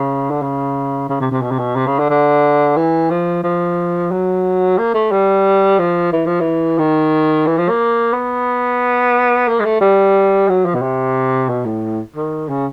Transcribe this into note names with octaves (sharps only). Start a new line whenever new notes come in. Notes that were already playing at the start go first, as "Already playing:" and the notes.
Already playing: C#3
D3
C#3
C#3
C3
C3
B2
C3
B2
C3
C#3
D3
D3
E3
F3
F3
F#3
A#3
A3
G3
F3
E3
F3
E3
D#3
E3
F3
A#3
B3
A#3
G#3
A3
G3
F#3
F3
B2
C3
B2
A2
D#3
C#3